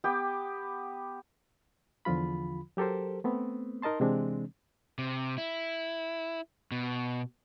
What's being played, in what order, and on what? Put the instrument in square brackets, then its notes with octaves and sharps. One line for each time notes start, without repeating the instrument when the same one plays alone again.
[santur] B3 G4 G5 D6
[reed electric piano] E2 D3 F3 F4 B5
F#3 G4 A4 A#4 C5
A3 B3 C4
D#4 A#4 D#5 A5 C6
C3 E3 G#3 C4 D4
[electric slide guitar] C3
E4
B2